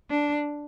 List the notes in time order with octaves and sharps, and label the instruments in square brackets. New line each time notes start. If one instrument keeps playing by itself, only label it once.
[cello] D4